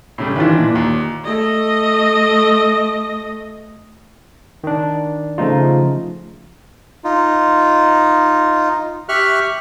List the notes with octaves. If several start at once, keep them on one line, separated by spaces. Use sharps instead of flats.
A2 C#3 G3
D#3 E3 D4 F4 B4
A#2
D#2
A3 D#5
D#3 D4
C#3 F3 A3 D#4 F4
D#4 F4
G4 E5 C#6 F6 F#6